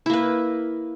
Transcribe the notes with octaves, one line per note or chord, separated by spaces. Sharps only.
A#3 E4 B4